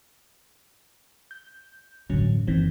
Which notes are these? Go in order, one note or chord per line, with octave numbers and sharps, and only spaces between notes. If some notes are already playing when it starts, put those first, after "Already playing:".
G6
A1 G2 D3 F#3 C#4
F#1 D#3 E3 C4